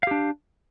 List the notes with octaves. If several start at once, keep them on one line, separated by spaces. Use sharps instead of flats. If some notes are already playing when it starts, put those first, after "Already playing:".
D4 G4 F5